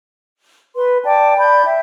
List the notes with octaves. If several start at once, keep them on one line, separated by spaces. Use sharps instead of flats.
B4 C6
D5 G5 A5 D6
D5 B5 G6
E5 G5